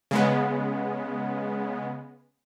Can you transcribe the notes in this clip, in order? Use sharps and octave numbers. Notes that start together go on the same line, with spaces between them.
C#3 G#3 B3